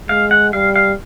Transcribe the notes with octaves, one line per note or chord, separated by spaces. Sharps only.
G#3 F5
F#5
G3 F5
F5